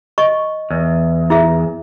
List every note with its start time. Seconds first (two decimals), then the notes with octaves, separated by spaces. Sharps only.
0.18 D#5 C#6
0.71 E2
1.30 E4 G#4 E5